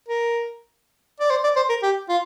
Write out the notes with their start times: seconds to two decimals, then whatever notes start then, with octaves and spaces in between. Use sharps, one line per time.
0.08 A#4
1.20 D5
1.30 C5
1.44 D5
1.56 C5
1.69 A#4
1.83 G4
2.09 F4